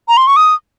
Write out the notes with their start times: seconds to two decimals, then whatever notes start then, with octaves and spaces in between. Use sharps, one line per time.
0.08 A#5
0.17 C6
0.27 C#6
0.36 D#6